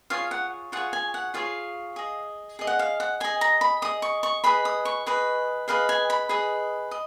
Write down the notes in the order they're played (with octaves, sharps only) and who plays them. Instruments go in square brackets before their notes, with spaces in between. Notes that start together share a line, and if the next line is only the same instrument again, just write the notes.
[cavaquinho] F4 G#4 C#5 F5
F#5
F4 G#4 C#5 F#5
G#5
F#5
F4 G#4 C#5 F5
G#4 D#5
G#4 D#5
F#5
F5
F#5
G#4 D#5 G#5
A#5
B5
G#4 D#5 D#6
C#6
C#6
G#4 B4 D#5 B5
D#6
C#6
G#4 B4 D#5
G#4 B4 D#5 F5
G#5
B5
G#4 B4 D#5
D#5